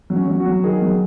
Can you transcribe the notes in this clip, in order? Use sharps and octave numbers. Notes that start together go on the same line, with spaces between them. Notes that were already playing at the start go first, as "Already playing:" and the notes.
F#3
C#4
F#3
F#4
F#3
D#3 G#4
F#3